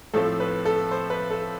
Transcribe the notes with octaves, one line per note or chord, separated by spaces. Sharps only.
A2 F3 A3 C4 A4
B4
A4
C5
B4
A4